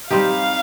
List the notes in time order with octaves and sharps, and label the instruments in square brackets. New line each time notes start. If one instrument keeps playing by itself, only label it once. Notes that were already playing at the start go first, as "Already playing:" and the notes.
[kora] G3 C4 D#4 G4 [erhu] F5